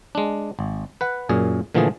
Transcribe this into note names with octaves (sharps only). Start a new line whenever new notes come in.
G#3 D4
G#1
B4 F#5
F#2 A#2 G#4
A#2 D3 E3 F3 A3 G#4